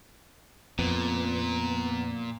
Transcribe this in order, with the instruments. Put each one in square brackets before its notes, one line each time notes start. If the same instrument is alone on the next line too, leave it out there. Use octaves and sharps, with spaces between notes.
[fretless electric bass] F2 [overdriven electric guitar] A#2 [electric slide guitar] B3